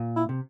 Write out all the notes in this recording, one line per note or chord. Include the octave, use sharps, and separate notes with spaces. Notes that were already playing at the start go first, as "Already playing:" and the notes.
Already playing: A#2
E4
C3